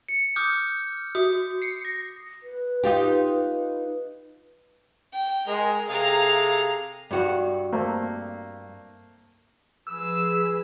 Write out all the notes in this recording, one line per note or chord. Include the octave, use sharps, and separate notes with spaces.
C#7
D6 D#6 F6 G6
F#4 D#6
C7 C#7
A#6
B4
D#4 F4 G4
G5
G#3 A#4
C3 G#4 A4 F5 A#5
G2 F#4
A3 A#3 C4
F3 G#4 B4 E6